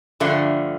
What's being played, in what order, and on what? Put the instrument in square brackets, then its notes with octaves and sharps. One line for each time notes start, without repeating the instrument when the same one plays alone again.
[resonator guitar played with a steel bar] G2 D3 F3 A3